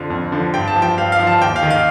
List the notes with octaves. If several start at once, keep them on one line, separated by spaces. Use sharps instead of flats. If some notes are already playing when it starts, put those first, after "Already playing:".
Already playing: F2 D3 F3
F2
D3 F3
G2 G5
A5
F3
G5
G2 F5
F5
F3
A5
D#2 G5
F5
D#3
F5